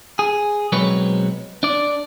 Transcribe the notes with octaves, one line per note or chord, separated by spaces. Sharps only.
G#4
B1 F#3 G#3 C4 B4 C#5
D4 D5